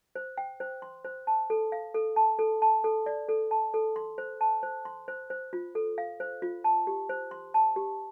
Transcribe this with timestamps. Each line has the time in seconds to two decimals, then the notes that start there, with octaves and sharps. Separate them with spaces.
0.15 C5
0.38 G5
0.60 C5
0.82 C6
1.05 C5
1.27 A5
1.50 A4
1.72 F5
1.94 A4
2.16 A5
2.39 A4
2.62 A5
2.84 A4
3.06 D5
3.29 A4
3.51 A5
3.74 A4
3.96 C6
4.18 C5
4.41 A5
4.63 C5
4.85 C6
5.08 C5
5.30 C5
5.53 F4
5.75 A4
5.98 F5
6.20 C5
6.42 F4
6.64 A5
6.87 G4
7.09 C5
7.31 C6
7.54 A5
7.76 G4